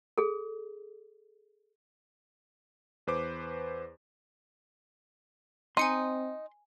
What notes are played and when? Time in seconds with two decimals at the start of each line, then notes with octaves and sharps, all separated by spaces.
0.18 G#4 A4
3.07 E2 B4 C5 D6
5.77 C4 D#4 G#5 C6 C#7 D#7